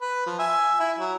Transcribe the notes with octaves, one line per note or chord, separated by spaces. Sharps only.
B4
F3
E5 G#5
E4
F#3